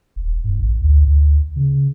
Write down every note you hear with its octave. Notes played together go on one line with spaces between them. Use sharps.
D#1
G2
A1
D2
D2
C#3